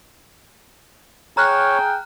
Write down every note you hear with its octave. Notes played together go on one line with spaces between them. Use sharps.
G#4 C#5 G5 A#5 F6 F#6